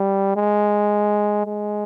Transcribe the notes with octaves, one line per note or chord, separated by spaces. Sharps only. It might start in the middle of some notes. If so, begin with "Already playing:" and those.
Already playing: G3
G#3
G#3